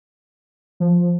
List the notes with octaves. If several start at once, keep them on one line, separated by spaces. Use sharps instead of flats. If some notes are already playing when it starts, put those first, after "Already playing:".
F3